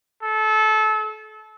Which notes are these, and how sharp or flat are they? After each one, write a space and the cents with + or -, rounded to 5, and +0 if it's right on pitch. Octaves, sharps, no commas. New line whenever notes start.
A4 -25